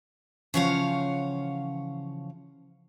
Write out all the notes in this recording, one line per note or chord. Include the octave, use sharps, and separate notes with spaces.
C#3 E3 F3 C#5 F5 F#5